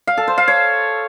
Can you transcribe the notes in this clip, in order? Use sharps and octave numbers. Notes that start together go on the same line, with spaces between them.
F5
A4
C5
F5
C#5